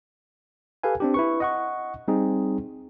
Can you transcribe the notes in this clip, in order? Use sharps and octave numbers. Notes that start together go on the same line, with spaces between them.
G4 A4 B4 F5 G#5
C4 D4 G4
E4 B4 C#6
D#5 F#5 C#6
G3 C4 D#4 G#4